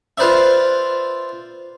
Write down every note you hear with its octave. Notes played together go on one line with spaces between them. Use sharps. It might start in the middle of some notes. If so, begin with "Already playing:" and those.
F4 B4 C5 D5 E5